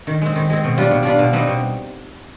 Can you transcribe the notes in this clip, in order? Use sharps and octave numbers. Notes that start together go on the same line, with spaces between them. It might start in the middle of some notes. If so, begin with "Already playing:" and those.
D#3
G#3 C4
D#3
G#3 C4
B2
G3 D4 F4 B4
B2
G3 D4 F4 B4
B2
G3 C4 D#4 B4
B2